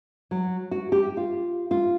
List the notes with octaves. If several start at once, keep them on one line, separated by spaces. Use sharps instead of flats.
F#3
F#4
G4
F4
F4